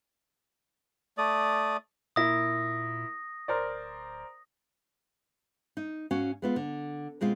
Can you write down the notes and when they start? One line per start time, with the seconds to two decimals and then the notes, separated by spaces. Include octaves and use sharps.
1.18 A3 D5 D#6
2.16 A#2 A#3 E4 D#6 A#6
3.48 D1 A#4 C5 D5
5.77 D#4
6.11 G#2 C#4 F#4 F5
6.42 G#3 B3 F4
6.56 D3
7.21 B2 G#3 C4 F4